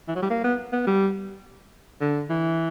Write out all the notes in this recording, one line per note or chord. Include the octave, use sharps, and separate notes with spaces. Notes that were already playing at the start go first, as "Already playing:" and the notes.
E3
F#3
G3
A#3
B3
B3
G3
D3
E3